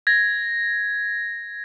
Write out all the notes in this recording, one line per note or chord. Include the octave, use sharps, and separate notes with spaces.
G#6 A#6